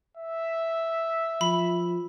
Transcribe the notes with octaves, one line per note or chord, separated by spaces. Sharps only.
E5
F3 B5